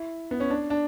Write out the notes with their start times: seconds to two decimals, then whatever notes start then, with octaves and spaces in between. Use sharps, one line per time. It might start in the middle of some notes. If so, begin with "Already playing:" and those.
Already playing: E4
0.31 B3
0.40 C#4
0.50 D4
0.70 D4